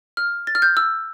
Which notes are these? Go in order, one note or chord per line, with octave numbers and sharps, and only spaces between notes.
F6
A6
F6
G6
E6